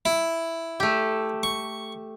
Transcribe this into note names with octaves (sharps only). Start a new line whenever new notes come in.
E4
A3 G4
C#6